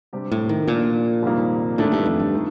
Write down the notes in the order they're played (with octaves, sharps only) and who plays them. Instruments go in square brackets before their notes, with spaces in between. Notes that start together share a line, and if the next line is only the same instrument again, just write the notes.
[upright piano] C3 G3 D4 G4
[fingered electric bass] A2
D#3
[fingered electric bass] A#2 [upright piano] F3 A#3 D4
[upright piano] F2 C3 D#3 G3 A#3
[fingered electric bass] A2 [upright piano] D#3 A3 D4
[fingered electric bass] G2
F2
G2
[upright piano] D#3